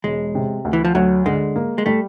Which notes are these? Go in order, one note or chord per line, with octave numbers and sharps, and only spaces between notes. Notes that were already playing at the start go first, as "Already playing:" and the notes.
E1 G#3
C3
D2
E3
F3
D2 F#3
D3 G#3
A#3
G#3
G3 A3